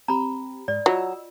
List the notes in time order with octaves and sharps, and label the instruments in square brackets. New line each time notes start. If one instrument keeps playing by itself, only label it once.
[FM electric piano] C4 G4 [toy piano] A#5 B5
[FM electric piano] G#2 [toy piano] D5
[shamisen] F#3 [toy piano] F4 [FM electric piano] F#4 D#5 E6